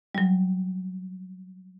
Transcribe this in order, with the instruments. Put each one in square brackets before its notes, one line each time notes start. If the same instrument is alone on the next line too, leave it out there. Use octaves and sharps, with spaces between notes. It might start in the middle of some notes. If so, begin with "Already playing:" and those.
[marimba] F#3 G3